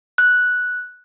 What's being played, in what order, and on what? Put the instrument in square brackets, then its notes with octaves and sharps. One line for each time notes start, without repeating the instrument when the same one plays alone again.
[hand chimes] F#6